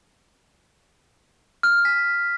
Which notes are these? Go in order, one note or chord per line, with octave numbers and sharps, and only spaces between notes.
F6
B6